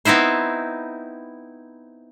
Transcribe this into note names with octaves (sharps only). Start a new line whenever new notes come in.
B3 C4 D#4 E4 C5